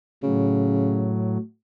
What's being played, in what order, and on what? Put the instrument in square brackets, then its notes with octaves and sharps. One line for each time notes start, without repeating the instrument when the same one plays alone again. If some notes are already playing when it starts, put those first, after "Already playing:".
[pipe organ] A2 F#3 [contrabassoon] C#3